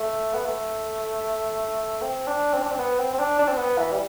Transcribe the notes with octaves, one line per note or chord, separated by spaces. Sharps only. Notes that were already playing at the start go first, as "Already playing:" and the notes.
Already playing: A3
B3
A3
C4
D4
C4
D4
C4
B3
C4
C4
D4
D4
C4
B3
E3
G3